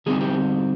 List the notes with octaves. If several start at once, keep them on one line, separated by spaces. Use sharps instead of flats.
D3 G3 C4 D#4 G#4
G4